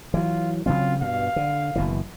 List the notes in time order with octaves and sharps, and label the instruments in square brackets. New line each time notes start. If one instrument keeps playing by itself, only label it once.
[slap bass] E3 F#3 [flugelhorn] F4
[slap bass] C#3 F#3 C4 [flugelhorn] F4
[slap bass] G2 B2 [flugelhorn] F5
[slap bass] D3
F#1 B2 E3